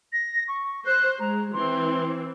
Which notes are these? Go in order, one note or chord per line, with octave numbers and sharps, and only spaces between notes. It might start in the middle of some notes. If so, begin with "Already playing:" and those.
A#6
C#6
C5 F#6
G#3 A#5
E3 C4 C6